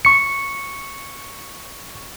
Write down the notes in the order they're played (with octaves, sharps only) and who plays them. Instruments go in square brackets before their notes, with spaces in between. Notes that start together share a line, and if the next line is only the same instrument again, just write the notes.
[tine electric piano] C#6 C#7